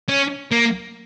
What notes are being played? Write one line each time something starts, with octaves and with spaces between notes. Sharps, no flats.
C#4
A#3